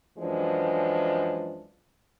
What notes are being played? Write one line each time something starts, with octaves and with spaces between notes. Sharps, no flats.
F#2 E3 F3 G#3 D4